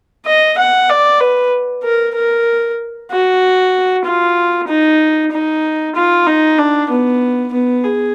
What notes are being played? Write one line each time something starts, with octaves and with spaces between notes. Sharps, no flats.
D#5
F#5
D5
B4
A#4
A#4
F#4
F4
D#4
D#4
F4
D#4
D4
B3
B3
G#4